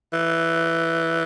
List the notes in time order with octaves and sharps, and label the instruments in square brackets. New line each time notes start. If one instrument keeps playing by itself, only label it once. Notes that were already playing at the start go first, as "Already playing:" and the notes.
[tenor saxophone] E3